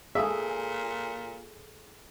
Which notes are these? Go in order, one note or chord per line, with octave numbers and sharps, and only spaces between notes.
A#2 G#4 A4 E5 D#6